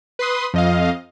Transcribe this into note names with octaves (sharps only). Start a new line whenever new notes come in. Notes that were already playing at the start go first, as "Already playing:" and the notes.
B4 C6 D#6
F2 D#5 F5